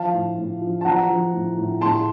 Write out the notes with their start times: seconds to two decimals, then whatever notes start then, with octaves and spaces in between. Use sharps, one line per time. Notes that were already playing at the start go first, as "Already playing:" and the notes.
Already playing: F3 F5 A5
0.13 A2
0.38 A2
0.62 F3
0.81 A5
0.85 F3 F#5 A#5
1.10 F3
1.33 A2
1.57 A2
1.81 A2 A5 C6